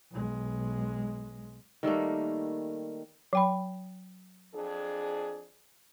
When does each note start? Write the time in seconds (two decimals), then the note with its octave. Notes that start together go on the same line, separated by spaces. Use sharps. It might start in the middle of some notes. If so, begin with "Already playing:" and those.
0.12 B1 G#3
1.83 D#3 G3 A3 A#3
3.33 F#3 G5 B5
4.54 F2 D4 G#4